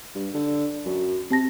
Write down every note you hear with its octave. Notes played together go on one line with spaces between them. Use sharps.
G2
D3
F#2
C3 C4 A5 A#6